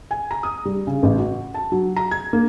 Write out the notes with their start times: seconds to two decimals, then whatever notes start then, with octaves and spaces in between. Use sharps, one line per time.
0.11 G#5
0.31 A#5
0.43 D#6
0.65 G3
0.87 C#3
1.03 A1
1.18 F#4
1.54 A5
1.72 F#3
1.96 A#5
2.11 G#6
2.33 A#3